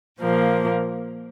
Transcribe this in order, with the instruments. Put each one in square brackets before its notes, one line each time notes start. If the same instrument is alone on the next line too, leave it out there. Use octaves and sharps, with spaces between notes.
[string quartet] A#2 F3 A#3